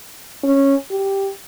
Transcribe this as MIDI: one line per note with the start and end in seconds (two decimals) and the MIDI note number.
0.43 0.75 61
0.91 1.30 67